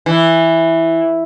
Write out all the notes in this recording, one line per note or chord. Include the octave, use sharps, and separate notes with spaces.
E3